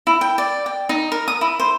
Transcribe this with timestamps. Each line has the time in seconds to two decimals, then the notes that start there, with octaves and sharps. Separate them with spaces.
0.07 E4
0.21 G5
0.38 D5
0.66 G5
0.89 D#4
1.12 A#4
1.28 D#6
1.41 E4
1.60 C5